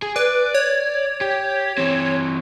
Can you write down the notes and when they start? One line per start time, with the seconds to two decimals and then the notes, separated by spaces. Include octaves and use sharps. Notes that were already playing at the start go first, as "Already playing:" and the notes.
0.02 G#4
0.16 B4 D5
0.54 C#5
1.21 G4
1.78 E3 C4